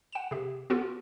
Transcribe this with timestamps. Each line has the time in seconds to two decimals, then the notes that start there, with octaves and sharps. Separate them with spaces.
0.13 F#5 E7
0.31 C3 G4
0.70 B3 F4 F#4 A4